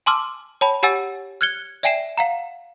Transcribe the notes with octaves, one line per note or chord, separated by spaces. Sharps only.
G#5 A5 C6 D6 E6 F6
C#5 G5 A5 B5
G4 C#5 F#5 G#5 E6 A6
F6 F#6 G#6 C#7 G7
D5 E5 G5 G#5 C7 E7
F5 F#5 A#5